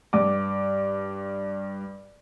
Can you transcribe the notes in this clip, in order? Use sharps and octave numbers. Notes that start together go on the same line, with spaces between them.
G2 D6